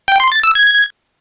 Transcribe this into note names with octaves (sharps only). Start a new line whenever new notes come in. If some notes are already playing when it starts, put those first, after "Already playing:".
G5
C6
A6
E6
G#6